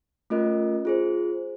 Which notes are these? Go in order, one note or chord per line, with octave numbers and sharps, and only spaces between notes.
A3 C#4 F4 A#4 D#5
F4 G#4 C5